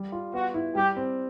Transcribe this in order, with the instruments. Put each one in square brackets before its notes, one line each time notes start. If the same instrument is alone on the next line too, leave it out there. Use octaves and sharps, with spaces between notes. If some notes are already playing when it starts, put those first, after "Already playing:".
Already playing: [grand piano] G3
F4
[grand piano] B3 [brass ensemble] F#4
[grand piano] E4
[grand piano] G3 [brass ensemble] G4
[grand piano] C4